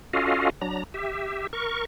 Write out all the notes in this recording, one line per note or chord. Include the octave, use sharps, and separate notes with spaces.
C#4 F4 F#4 A4 D#5 F5
F#3 D4 A#5
G4 E5
A#4 C#6